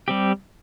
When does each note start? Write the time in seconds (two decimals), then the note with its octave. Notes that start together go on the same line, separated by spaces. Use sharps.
0.08 G3 C4 G4